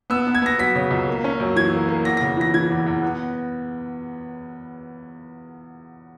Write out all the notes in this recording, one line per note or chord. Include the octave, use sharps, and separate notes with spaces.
B3 E6
B3
G#6
B3 A#6
F#3 B6
C#3
C#2
A#3
C#4
F#2
E3 G#6
A#3
A#3
E2 A#6
A#6
C#3
E3 A#6
E3 G#6
E2
E2
B3